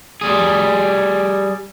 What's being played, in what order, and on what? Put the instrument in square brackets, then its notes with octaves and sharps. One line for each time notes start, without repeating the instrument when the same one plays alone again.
[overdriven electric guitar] G3 G#4